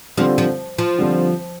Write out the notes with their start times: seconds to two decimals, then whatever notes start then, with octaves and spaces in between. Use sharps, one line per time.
0.17 D3 F3 G3 C4 F4
0.38 F3
0.78 F3
0.98 D3 G3 C4 F4